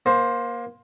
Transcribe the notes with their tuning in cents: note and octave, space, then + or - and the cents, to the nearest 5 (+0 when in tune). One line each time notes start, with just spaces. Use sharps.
A#3 +25 C5 +5